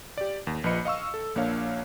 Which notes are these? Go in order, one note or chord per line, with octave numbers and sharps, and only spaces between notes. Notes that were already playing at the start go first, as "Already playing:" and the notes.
G4 D5
D#2
A#1 F3 B4 D#5 B5 C#7
D#5 F5 C#6 E6
A4
A#1 A#3 D4 C#5 F5